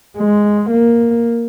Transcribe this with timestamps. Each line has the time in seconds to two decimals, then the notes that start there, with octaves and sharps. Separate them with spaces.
0.17 G#3
0.71 A#3